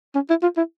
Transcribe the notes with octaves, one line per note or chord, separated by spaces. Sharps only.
C#4
E4
F4
E4